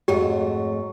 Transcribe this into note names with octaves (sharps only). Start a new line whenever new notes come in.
F2 G#2 F#3 A3 G4